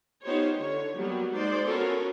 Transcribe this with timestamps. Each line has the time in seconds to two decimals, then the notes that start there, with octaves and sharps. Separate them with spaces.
0.23 B3 D#4 F4 G4 C5 C#5
0.58 D3 C#5
0.94 F#3 G3 A#3 B3 G4 A#4
1.31 G#3 A#3 D#4 C5 D5
1.66 B3 C#4 F4 F#4 A4 A#4